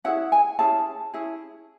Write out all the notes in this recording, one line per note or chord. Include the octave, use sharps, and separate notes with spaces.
C#4 E4 G#4 F#5
G#5
C#4 E4 G#4 A5
C#4 E4 G#4